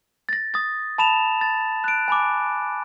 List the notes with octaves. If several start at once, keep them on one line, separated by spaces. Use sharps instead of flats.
A6 A#6
D#6 A6
A5 B5 E7 F7
A6
F#6 D7
G#5 B5 D6